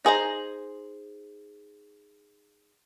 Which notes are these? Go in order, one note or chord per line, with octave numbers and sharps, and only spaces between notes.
D#4 G#4 C5 A#5